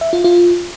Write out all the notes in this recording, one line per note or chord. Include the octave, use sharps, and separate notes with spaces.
E5
F4
F4